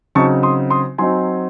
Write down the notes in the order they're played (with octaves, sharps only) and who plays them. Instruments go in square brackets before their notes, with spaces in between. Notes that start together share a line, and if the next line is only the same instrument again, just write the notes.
[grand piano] C#3 F#3 C4 D#4 A5 C#6
C6 D#6
C6 D#6
F#3 C4 D#4 G#5 C6